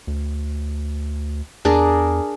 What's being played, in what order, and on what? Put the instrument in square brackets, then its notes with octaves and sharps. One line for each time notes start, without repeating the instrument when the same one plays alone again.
[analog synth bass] D2
[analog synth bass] E2 [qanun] D4 G#4 A#4